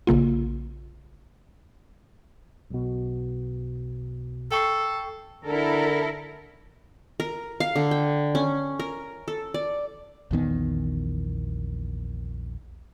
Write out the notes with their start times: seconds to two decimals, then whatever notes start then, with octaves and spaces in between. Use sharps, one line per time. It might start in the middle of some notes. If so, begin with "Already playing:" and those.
0.07 A#1 C#3 A#3 F4
2.71 B1 B2
4.52 A4 G5 C#6 C7
5.45 D3 E4 A4 A#4
7.20 A#4
7.60 F5
7.76 D3
7.91 G5
8.35 C#4
8.80 A#4
9.28 A4
9.54 D5
10.31 A#1 E2 D#3 B3